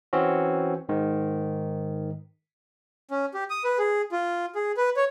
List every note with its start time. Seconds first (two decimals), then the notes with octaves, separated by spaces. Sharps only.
0.13 E3 C4 C#4 F#4
0.89 G#2 D#3
3.11 C#4
3.34 G4
3.50 D#6
3.64 B4
3.78 G#4
4.12 F4
4.55 G#4
4.77 B4
4.97 C#5